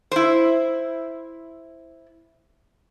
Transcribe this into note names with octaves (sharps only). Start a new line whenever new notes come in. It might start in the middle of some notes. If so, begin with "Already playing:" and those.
E4 C5